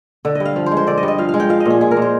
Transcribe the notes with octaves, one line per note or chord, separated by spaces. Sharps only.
D3
G2 D#5
F5
F3
C5
G#3
C5
D3 D5
D#5
G2
D#5
F3 F5
F5
G#3
G5
F3 F5
D#5
A#2 G#4
G#3 G#4
A#4
A#2
C5